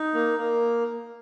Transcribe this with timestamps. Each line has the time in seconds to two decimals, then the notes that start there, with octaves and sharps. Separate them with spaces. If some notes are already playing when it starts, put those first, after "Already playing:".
Already playing: D#4
0.14 A#3
0.38 A#3